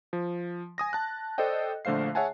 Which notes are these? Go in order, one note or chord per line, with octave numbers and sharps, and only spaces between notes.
F3
G#5 D#6 A#6
A5 F#6
A4 C5 D5 D#5 G5
A#1 D3 A3 C5 F5 C7
G#4 C#5 E5 F#5 G#5 A5